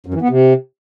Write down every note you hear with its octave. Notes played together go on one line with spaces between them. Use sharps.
F#2
E3
B3
C3